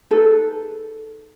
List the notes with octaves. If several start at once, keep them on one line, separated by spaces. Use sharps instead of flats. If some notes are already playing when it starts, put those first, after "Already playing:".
D#4 G#4 A4 B4